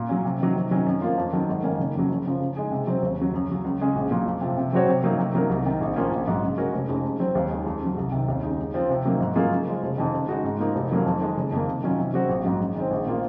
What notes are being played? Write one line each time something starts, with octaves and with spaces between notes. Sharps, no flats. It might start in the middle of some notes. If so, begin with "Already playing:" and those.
Already playing: A#2
F#3 C#4
C3
D#3 F#3
C3
D#3 F#3 C#4
F#2
F3 A#3 F4
F2
D#3 F#3
G#1
F#2 D#3 A#3 C#4
F#1
F2 C#3 F#3
F#1
F#2 C#3 F3
C#3
G#3 D#4 G#4
C3
F#3 C4
D#2
C#3 F#3
F#2
C#3 F#3
C#2
C#3 G#3 C#4 G#4
A#1
A#2 F#3
F2
C3 F3
C3
F#3 C4 F#4 C#5
C3
F#3 A#3 D#4
C3
F#3 A#3 D#4 A#4
C2
C3 D#3
A#1
A#2 F3 A#3 C#4
A#1
G#2 F#3
C#3
G#3 C#4 F#4 A#4
F1
F2 C#3 G#3 D#4
C#3
F#3 C4
D#2
D#3 G#3
F2
C#3 F#3
C2
C3 D#3
D#2
C#3 G#3 D#4
F#2
F3 C4
C3
D#3 F#3 A#3 D#4
G#2
F#3 A#3 F4 G#4
C#3
F3 G#3
F1
F2 D#3
C#3
G#3 D#4 F#4
G#2
F3 A#3 D#4
F1
F2 D#3 F#3 A#3
F2
D#3 G#3
F#1
F2 D#3 A#3
C3
D#3 F#3 C#4 F4
C3
F#3 C4 F#4
A#1
G#2 F#3
F#2
D#3 G#3 C4
A#1
A#2 F3 A#3